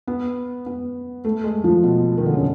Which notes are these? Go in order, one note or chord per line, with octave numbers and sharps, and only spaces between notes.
B3
B3
A3
G#3
F3
B2
D#3
D3
C#3